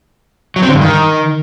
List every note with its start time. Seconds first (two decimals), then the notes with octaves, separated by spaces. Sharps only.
0.56 F#3
0.62 C4
0.69 D3
0.75 G2
0.81 D#3